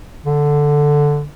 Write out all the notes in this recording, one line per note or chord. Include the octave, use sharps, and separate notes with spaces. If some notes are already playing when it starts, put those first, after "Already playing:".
D3